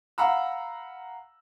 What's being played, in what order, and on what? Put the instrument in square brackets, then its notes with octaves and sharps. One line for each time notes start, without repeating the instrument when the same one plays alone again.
[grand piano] F5 F#5 A#5 B5 E6